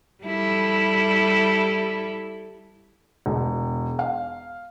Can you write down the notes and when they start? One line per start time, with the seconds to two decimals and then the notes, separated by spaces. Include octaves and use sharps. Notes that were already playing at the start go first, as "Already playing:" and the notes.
0.24 G3 E4 A4
3.26 E1
3.99 F5